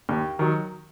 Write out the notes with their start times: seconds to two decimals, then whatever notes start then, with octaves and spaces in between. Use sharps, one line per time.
0.09 D#2
0.39 D#3 F#3